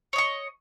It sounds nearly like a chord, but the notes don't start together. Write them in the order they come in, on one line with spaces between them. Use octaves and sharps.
C#5 D#5 C#6